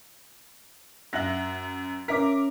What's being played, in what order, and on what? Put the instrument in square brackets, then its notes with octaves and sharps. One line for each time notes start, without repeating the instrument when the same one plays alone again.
[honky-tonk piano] F#2 F#5 F#7 [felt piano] E5 F#6 A#6
[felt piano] C#4 E5 B6 [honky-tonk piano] A#4 D6